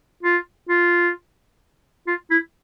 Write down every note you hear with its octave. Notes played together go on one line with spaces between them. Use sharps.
F4
F4
F4
E4